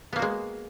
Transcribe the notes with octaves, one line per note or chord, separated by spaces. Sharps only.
G#3 A#3 B3 F#4